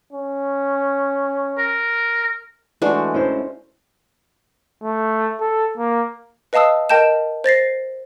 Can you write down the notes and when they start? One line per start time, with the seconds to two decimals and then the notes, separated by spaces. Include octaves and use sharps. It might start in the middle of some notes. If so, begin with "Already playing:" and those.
0.13 C#4
1.59 A#4
2.82 E3 G#3 A3 D4 F#4
3.14 C#4 E4 C5
4.83 A3
5.40 A4
5.77 A#3
6.53 B4 D#5 F5 A5 D#6 E6
6.89 A#4 D#5 G5 A5 G6 E7
7.44 C5 A6 A#6 C7